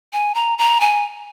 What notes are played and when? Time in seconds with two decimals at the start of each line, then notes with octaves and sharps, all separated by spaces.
0.13 G#5
0.35 A#5
0.58 A#5
0.81 G#5